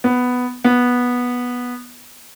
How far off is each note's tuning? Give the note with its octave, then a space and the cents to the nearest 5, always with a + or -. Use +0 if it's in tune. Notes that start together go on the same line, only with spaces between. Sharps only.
B3 +5
B3 -10